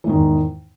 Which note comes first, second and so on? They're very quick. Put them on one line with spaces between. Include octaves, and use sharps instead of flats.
E3 G#2 D#3 E2